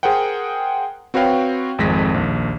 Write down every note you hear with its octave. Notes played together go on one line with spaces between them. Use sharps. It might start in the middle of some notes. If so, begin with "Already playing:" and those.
G#4 A#4 C5 F#5 G5
C4 F#4 B4 C#5 F5 G5
G#1 F2 G#3 A#6 B6
A#1 D#2